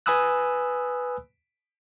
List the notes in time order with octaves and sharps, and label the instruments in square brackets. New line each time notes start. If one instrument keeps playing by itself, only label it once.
[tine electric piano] B4 G#5 B5 D#6 E6 F#6